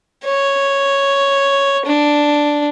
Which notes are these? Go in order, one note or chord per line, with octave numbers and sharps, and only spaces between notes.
C#5
D4